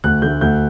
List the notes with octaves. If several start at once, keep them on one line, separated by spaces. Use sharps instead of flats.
D2 F#6
D3 A3 G6
D2 G6